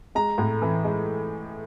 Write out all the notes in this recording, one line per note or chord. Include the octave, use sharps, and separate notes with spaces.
G#3 A#5
A2
E3
G#3